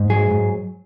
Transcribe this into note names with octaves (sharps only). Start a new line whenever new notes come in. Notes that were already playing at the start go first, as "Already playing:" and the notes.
Already playing: G#2
F#3 G#4
G#2